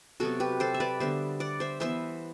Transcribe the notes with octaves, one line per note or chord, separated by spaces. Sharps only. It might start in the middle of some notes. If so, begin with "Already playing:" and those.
C3 F#3 B3 F#4 A4
G4 B4
A4 C5
E5
B4 D5
D3 G3 B3 C5 E5
D5 F#5
C5 E5
E3 B3 C5 E5